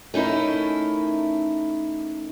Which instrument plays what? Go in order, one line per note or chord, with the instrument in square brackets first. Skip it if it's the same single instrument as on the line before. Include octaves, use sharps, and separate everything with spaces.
[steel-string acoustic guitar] A3 C#4 D#4 E4 A#4